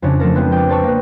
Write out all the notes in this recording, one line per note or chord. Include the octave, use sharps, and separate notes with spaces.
F2 C#3 C#4 D4
F3 A3 A4 A#4
G#3 B3 C4 F4
G5 D6
C5 D5 A5 C#6 E6
A#3 B4